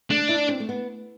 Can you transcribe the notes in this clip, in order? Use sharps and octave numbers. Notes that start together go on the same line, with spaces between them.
A3 D4
E4
C4
A3
B3